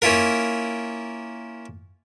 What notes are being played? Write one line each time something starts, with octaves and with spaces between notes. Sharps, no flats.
A#3 C#4 E4 F4 A#4